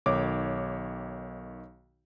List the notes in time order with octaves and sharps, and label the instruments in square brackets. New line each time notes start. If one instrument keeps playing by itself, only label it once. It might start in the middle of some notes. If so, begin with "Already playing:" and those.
[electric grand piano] B1 D#3 C#5 D6